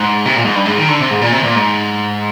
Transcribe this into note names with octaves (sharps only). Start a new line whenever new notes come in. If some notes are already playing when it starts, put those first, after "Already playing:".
Already playing: G#2
C3
A#2
G#2
G2
G#2
D#3
D3
C3
G#2
A#2
C3
A#2
G#2